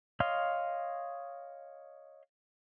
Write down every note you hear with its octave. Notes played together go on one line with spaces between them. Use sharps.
C#5 D#5 F5 C6